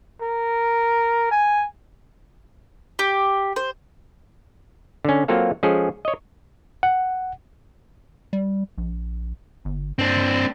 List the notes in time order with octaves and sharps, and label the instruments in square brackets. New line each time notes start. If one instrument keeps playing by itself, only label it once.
[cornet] A#4
G#5
[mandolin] G4
C5
[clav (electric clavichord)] D3 C#4
F#3 A#3 C4 F4 A4 F5
F3 G#3 C#4 G#4 A4
C#5 D#5
[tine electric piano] F#5
[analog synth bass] G3
A#1
G1
[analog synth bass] G2 [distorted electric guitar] C4 D4